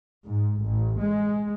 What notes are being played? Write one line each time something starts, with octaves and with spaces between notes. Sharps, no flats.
G#2
A1
G#3